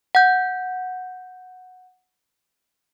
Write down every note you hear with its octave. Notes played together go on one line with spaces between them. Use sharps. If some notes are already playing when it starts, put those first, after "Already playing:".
F#5 G6